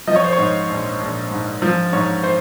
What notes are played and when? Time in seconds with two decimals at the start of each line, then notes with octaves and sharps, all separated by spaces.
0.07 F3 D#5
0.16 C#5
0.24 C5
0.33 C#5
0.38 G#2
0.69 A#1
1.00 A#1
1.31 G#2
1.62 F3
1.93 G#2 C#5
2.24 C5